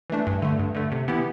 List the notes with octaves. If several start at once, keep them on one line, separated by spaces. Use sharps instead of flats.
E3 A3 D4
G2
D3 A3
G2
D3 A3
C3
E3 B3 E4 G4